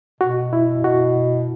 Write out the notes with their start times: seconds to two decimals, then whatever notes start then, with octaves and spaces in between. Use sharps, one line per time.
0.21 B2 F#4
0.53 E4
0.84 B2 F#4